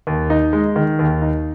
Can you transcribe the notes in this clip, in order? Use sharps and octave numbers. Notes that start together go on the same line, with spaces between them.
D#2
D#4
G#3
D#3
D#2
D#4